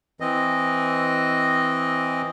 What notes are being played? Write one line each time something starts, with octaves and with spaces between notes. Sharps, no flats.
E3 C4 D#5